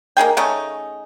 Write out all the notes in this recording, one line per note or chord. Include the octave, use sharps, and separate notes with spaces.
A#3 D#4 G#4 G5
C#3 A3 C#4 D#4